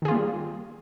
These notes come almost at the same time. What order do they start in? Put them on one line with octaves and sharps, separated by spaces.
D#3 G#4 F4 A#3 G3